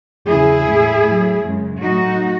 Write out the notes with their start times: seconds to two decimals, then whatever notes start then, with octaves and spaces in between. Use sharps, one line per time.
0.27 E2 C#3 F#3 E4 G#4
0.66 A2 G#3
1.04 A2 F#3 A3
1.43 F#2 C#3 G#3
1.80 A2 F#3 A3 D#4 F#4